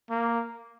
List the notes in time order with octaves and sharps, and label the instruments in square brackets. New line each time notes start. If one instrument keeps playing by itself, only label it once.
[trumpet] A#3